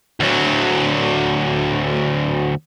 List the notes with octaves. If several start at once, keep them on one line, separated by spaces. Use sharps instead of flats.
D2 F#3